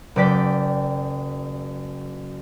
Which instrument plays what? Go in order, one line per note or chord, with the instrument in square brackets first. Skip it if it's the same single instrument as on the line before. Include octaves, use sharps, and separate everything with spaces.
[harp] F#1 B4 D5 G5 B6